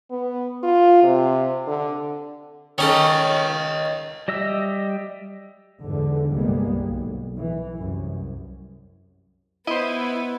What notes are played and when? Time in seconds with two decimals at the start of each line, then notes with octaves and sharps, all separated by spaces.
0.11 B3
0.63 F4
1.03 C3
1.67 D3
2.78 D#3 C#4 A4 C#5 D#5
4.28 G3 D#5 E5 E6
5.83 E2 G#2 D3
6.32 G1 C2 G3 G#3 A#3 B3
6.82 B1
7.37 E3
7.80 C2 F#2
9.67 B3 E4 C5 D#5